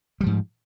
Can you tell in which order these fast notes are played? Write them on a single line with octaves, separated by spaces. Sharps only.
G3 F3 G#2